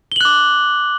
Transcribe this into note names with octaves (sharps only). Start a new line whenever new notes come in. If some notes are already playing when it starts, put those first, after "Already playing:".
D6 F#6 F#7 G7